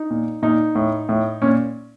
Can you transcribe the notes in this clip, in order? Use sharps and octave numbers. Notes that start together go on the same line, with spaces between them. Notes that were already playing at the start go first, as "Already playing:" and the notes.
Already playing: D#4
A#2
A#2 D#4
A2
A2
A#2 C#4